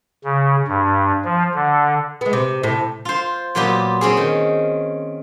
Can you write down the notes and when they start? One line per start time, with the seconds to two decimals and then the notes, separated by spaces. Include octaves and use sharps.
0.24 C#3
0.68 G2
1.25 F3
1.55 D3
2.21 G#3 B3
2.33 C3
2.63 A2 C3
3.05 F4 C5
3.55 A#2 F#3 B3 F4 G4
4.01 C4 C#4 G#4
4.17 D#3